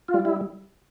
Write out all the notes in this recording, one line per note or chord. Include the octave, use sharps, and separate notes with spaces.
F4
G3
E4